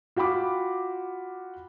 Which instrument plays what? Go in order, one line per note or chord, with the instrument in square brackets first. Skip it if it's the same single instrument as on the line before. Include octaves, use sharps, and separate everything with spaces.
[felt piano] F4 F#4 G5 B5 D6